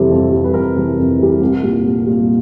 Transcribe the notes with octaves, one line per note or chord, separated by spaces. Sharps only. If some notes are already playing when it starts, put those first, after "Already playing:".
Already playing: F2 C3 E3 G3 A4
F2
C3 E3 G3
B4
F2 A#4
C3 E3 G3
F2
C3 E3 G3
C2
A#2 G3
C2
A#2 G3